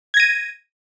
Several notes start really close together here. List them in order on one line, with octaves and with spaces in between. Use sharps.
G#6 A#6 D#7